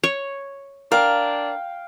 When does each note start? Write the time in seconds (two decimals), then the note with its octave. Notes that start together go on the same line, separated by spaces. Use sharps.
0.04 C#5
0.92 D4 A#4 F5 G5